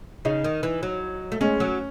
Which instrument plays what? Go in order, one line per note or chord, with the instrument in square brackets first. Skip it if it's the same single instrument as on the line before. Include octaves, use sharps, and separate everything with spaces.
[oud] C#3 [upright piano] D#4
[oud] D#3
E3
F#3
A3
[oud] G#3 [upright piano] C#4
[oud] F#3